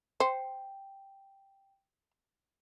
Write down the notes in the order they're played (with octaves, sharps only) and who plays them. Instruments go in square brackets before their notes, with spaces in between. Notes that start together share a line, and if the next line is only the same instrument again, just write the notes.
[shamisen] C5 [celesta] G5